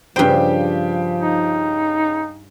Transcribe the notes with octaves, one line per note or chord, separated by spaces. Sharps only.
G2 C#3 F3 G4 C5 G5
D#4